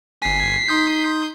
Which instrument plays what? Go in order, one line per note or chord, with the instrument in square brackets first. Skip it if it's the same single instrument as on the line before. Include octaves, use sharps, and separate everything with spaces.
[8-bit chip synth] G1 G#5 [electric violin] B6 C7
[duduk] D#4 [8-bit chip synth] C6 D#6 G6